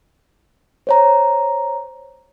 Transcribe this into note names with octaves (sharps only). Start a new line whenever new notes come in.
C5 C#5 A#5